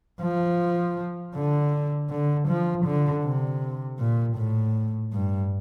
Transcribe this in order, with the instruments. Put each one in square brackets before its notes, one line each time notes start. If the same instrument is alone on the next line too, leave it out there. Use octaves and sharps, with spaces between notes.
[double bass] F3
D3
D3
F3
D3
C3
A#2
A2
G2